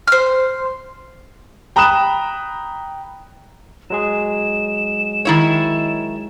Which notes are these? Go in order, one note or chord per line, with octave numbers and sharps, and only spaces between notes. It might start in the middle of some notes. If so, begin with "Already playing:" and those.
C5 F6
G5 A#5 B5 D#6 F#6 E7
F#3 G#3 G#4 E7
D#3 E4 C#5